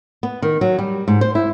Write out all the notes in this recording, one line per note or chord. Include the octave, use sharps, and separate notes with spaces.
B3
D#3
F#3
G3
G#2
C5
E4